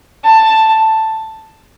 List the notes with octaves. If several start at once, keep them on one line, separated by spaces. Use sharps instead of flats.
A5